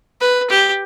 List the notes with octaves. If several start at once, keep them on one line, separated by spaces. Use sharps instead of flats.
B4
G4